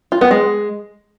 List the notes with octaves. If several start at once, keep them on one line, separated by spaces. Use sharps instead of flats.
F4
B3
G#3